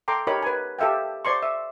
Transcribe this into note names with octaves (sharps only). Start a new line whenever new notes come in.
A4 G5 A#5 C6 D6
D#4 G4 A#4 C#5 B5
B4 G#5
G4 A4 E5 F5 G5
C5 D5 C6 C#6
E5